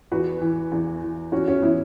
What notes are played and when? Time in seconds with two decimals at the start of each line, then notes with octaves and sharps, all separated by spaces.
0.12 E2 F#4 B4
0.41 E3
0.72 E2
1.02 E3
1.32 E2 C#4 F#4
1.48 C#4 F#4
1.62 E3 B3 E4